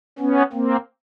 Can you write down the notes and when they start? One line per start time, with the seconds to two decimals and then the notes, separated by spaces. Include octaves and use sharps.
0.19 B3 C#4
0.53 A#3 C4